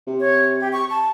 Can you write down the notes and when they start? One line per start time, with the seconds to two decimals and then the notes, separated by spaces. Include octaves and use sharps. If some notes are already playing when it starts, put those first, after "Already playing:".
0.07 C3
0.20 C#5
0.60 G4
0.73 C#6
0.90 A5